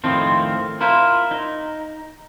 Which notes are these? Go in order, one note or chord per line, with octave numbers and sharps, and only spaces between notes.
F2 A2 D#3 F3 C4
E4 F4 A#4 C5
D#4